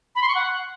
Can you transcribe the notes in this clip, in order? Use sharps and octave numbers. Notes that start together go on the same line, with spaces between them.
B5
C6
C#6
F#5